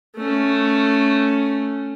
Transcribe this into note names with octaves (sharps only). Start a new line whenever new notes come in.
A3 C#4